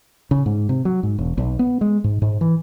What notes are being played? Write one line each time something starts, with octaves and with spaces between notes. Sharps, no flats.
C#3
G#2
C3
F#3
G#2
E1
B1
B3
G#3
G#2
G#2
E3